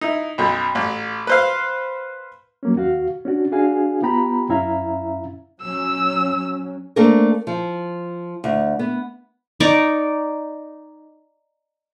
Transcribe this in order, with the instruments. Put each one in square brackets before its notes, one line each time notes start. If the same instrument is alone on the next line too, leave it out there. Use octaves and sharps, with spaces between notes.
[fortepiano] D#4 E4
B1 F#2
A1
B4 C5 F5
[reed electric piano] F#3 A#3 C#4
D#2 F#4 F5
C#4 D4 F#4
D4 F#4 G#4 F5 G#5
B3 F4 G4 G5 A#5 B5
F#2 C#4 E4 E5 F5 A#5
[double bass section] F#3 C#4 [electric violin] E6
[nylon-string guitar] A3 A#3 C4 D4 A#4
F3
D2
B3
[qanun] D#4 D5 C#6 D6